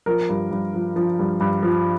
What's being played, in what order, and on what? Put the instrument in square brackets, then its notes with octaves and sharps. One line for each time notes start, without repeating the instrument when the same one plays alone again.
[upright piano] F3 A#4
G2
G2
F3
F3
G2
G2
F3